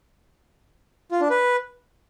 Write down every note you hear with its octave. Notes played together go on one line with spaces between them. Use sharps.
F4
D4
B4